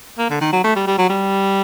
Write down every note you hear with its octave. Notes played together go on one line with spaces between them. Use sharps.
A#3
D3
D#3
F#3
A3
G3
G3
F#3
G3